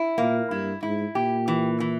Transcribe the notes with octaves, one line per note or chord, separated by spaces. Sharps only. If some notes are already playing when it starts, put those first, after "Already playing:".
Already playing: E4
A#2 A#3
G2 E4
G#2 E4
A#2 G4
E3
E3